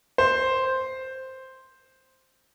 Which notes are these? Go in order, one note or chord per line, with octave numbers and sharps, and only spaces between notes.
C5